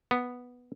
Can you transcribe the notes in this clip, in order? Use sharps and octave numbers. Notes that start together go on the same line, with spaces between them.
B3